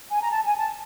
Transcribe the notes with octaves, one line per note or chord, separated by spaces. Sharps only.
G#5
A#5
A5
G#5
A5